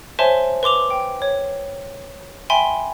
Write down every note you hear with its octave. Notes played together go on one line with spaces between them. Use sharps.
C5 C#5 E5 G#5 A5 C6
B4 C6 D6 F7
G5
C#5
E5 G5 G#5 B5 C6